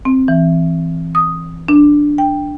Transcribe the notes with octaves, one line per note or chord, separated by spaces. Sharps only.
C4
E3
D#6
D4
G5